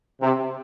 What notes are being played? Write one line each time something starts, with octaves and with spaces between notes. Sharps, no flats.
C3